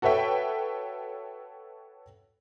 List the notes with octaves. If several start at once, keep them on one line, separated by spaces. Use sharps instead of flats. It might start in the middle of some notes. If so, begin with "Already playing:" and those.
F#4 A4 B4 C#5 E5 G5